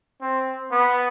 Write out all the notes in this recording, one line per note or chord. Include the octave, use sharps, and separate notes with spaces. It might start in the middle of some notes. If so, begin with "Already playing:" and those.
C4
B3